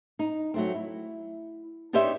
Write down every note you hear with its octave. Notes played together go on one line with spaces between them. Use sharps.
D#4
F#3 A3 C4
E4
D4 D#4 G4 C5 C#5 E5